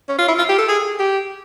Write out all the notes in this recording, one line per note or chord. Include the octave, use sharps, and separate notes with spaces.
C#4
F4
E4
F4
G4
A4
G#4
G4